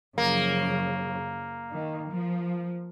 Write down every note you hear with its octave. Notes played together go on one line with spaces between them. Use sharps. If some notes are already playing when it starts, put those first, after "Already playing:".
F#2 C#3 F3 A#3
D#3
F3